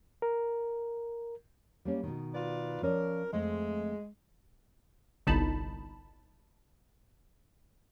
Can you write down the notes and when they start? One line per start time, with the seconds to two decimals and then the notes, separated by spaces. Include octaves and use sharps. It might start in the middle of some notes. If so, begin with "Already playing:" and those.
0.22 A#4
1.85 G3 A#3 C#4
2.03 B2 D#3
2.34 F4 B4 D5
2.82 F3 C#4 A#4 D5
3.33 F2 G#3 A3 C4
5.27 G1 C2 D#4 A5 B5